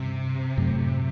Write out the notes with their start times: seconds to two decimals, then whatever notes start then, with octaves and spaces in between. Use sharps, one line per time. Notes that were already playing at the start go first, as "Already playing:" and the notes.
Already playing: G2 C3
0.57 F#2 A2